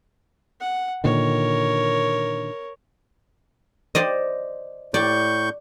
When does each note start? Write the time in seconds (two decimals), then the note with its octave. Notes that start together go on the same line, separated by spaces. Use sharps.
0.60 F#5
1.04 A#2 D3 D#3 A#4 C#5
3.95 C5 D5 D#5
4.94 A2 D5 C#6 G6